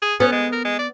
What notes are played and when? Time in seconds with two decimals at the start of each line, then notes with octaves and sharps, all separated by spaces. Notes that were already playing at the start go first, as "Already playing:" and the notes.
0.02 G#4
0.20 B3 C#4
0.32 G#3
0.52 A#4
0.65 G#3
0.79 D5